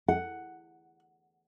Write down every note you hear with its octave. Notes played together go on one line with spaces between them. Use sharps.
F#5